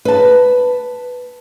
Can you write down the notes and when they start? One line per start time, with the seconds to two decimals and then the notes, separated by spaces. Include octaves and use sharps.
0.05 B4 A5